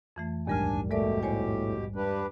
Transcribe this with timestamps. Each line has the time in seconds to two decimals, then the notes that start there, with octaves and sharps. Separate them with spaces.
0.16 F2 E3 A3
0.47 A#1 D#2 G#2 G3 D4 A#4 G#5 F6
0.91 B2 G#3 A3 G4 A#4 D5
1.23 A2 C5 C#5 G#5
1.96 G2 D4 G4 B4